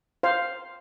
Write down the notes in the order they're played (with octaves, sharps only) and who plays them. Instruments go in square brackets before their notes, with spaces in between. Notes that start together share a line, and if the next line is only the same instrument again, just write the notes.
[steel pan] C5 F5